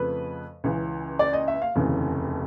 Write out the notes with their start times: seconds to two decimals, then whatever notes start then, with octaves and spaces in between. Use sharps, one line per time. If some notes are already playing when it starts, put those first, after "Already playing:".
Already playing: F2 C#3 F3 A3 B4
0.64 C#2 C#3 E3
1.19 D5
1.33 D#5
1.48 E5
1.62 F5
1.75 F1 D#2 C#3 E3